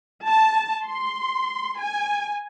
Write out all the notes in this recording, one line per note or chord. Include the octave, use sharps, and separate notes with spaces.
A5
C6
G#5